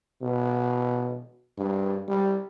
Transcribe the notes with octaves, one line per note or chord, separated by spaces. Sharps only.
B2
G2
G3